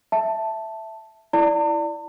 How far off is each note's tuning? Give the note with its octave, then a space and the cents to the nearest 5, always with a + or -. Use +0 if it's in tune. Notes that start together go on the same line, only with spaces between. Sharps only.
E5 +0 A5 +0
E4 +0 D5 +0 A5 +45